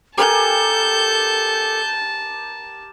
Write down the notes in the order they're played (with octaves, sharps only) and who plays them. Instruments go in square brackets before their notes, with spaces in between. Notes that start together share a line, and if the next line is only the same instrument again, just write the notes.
[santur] G4 A#4 G#5 [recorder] A4 [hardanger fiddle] A5 [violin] G6